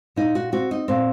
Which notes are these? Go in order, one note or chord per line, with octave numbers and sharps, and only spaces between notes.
A#2 D#4
F#4
C4 F#4
D#4
A#2 C4